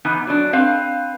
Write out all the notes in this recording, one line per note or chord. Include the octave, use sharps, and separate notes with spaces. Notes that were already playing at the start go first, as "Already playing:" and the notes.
E3 B3 D#4
F#3 D4
C4 B4 F5